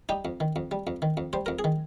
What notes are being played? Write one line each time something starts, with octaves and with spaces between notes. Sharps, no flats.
G3 D#4 G4
F2
D#3
F2
G3
F2
D#3
F2
G3 C5
F2 A#4
G#4
D#3